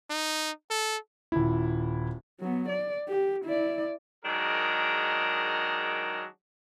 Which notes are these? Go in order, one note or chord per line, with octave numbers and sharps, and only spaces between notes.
D#4
A4
D#1 E4
F#3 B3
D5
G4
E4 D5
D#3 F#3 G#3 D4 G#4 A#4